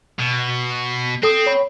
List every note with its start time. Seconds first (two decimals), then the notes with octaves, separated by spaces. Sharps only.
0.19 B2
1.23 C4 A4 D#6
1.46 C#5 B5